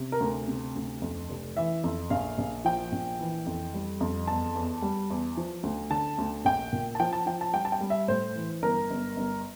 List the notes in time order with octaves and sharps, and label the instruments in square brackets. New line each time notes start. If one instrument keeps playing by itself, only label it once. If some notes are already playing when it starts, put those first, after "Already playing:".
Already playing: [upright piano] C3
A#4
D2
C3
D2
F2
F1
E3 E5
F2
A#1 F5
A#1
F3 G5
A#1
E3
F2
G3
F2
E2 A5
E2
G3
E2
F3
D2
D3 A5
D2
A#1 G5
A#2
A5
F3 G5
A5
F3 G5
A5
G3 G5
A5
G5
G3
E5
A2 C5
E3
G1 A#4
G1
G1